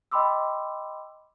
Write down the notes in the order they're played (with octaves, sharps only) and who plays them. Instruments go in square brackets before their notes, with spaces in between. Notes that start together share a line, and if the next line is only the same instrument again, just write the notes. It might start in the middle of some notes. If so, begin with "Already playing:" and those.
[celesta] D#5 G5 B5 C6 D6 E6